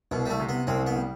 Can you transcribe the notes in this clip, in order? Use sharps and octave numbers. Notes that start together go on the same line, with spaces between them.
C2 B2
G3
A3
C3
B3
C2 C4
B3
G3